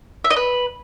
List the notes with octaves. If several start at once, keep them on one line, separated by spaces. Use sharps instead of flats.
E5
D#5
B4